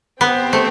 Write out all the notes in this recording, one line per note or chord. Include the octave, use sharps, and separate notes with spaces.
B3 C4 G4 C5 G5
A3